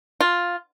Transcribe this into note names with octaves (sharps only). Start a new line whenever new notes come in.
F4